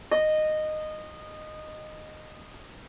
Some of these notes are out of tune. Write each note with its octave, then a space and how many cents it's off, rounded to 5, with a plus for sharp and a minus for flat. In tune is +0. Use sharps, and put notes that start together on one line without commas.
D#5 -15